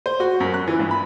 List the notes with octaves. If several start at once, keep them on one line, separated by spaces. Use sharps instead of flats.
C5
F#4
F#2
F#6
E3
G2
B5